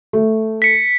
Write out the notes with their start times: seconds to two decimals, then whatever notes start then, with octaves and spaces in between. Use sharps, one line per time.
0.13 A3
0.62 B6 C#7